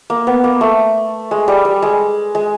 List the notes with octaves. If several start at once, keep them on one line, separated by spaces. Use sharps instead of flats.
A#3
B3
A#3
A3
G#3
G3
G3
G#3
G#3